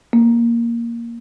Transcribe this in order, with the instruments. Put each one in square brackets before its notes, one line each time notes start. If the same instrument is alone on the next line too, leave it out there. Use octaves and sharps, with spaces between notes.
[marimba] A#3